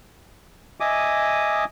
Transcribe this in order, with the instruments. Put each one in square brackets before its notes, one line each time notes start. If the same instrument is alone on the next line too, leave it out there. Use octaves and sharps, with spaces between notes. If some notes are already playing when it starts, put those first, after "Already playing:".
[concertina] D#5 E5 G#5 D6 D#6